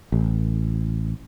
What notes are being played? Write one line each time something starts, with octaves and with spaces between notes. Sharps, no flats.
A1